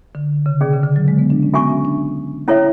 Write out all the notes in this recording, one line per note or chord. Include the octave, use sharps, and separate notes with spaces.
D3
C#3
B2 C#4 G#4 D5
C#3
D3
F#3
G#3
B3
D4
C#4
B3 F#4 A4 E5 G#5 C#6
C#4
D4
C#4 E4 A4 C#5 E5